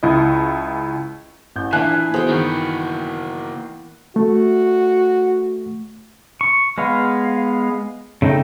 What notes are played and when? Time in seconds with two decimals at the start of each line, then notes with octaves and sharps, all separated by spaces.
0.03 C#2 E4 D#5
1.56 A1 G6
1.73 A#2 E3 D4 E5 G#5 F#6
2.14 B3 F#4 G#4 C5 G5
2.29 D#3 A#3 F#4
4.16 A3 F#4
6.41 C#6
6.78 G#3 B3 F5
8.22 C#3 A3 D#4 G5